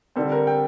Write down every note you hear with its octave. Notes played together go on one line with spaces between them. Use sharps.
D3 G3 C4 A4
A#4
G5